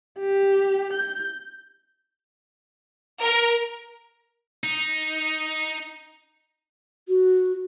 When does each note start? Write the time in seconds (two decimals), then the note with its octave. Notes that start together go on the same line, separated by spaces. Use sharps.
0.19 G4
0.93 G6
3.22 A#4
4.64 D#4
7.08 F#4